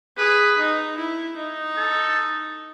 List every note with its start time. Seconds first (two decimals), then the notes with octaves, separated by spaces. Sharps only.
0.17 G#4 B4
0.58 D#4
0.97 E4
1.37 D#4
1.77 A4